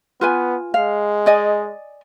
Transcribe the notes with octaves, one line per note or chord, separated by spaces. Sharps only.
B3 F4 B4 G#5
G#3 F5
D5 D#5 G#5